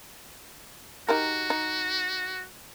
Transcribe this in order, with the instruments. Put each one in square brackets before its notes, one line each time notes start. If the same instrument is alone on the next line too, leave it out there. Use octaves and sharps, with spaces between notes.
[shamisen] D#4 G4 A#4 [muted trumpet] F#4
[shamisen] D#4